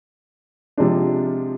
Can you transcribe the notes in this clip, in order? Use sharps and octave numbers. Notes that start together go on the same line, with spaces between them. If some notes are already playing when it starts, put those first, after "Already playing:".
C3 F3 G#3 D4